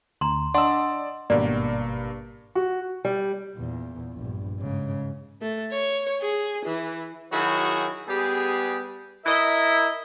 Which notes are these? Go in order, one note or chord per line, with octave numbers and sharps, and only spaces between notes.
D2 A#5 C6
D4 D5 D#5 F#5 C6 E6
G#1 G2 B2 A#3 D5
F#4
G3
E2 A#2
A#1 G2
G#2 C#3
A3
C#5
G#4
E3
D#3 F#3 E4 F#4 G#4
G3 B3 G4 G#4
E4 A#4 D#5 E5